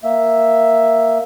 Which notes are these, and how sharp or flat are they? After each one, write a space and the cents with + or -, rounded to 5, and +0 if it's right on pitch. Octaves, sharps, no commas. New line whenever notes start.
A#3 +0 E5 +0